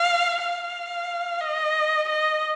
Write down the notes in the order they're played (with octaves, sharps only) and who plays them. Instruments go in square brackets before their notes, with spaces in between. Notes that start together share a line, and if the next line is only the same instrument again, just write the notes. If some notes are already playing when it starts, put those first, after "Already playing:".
Already playing: [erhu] F5
F5
D#5
D#5